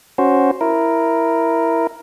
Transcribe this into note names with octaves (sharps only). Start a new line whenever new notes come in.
C#4 F#4 C5
E4 A#4